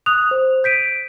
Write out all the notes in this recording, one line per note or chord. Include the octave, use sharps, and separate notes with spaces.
D#6 F#6 F7
C5
G6 B6 D7 D#7